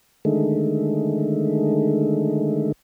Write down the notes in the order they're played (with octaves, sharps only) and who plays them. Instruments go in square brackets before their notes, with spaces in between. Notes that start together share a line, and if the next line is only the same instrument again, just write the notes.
[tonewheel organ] D3 D#3 G#3 A3